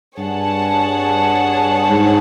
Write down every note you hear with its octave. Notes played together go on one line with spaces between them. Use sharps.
G2 G#4 C#5 F#5 A5
G#2